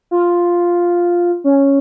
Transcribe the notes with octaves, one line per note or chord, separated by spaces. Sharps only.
F4
C#4